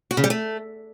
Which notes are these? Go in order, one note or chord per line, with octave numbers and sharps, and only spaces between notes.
F#4
C#3
G3
A3